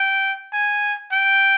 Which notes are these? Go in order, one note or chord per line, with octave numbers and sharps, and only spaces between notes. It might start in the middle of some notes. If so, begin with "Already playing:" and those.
Already playing: G5
G#5
G5